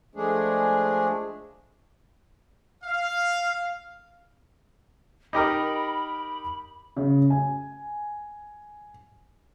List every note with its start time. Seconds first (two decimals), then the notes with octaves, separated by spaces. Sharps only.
0.15 F3 G#3 A3 D4 G#4
2.84 F5
5.33 D#4 G4 A#4 B5
6.97 C#3
7.30 G#5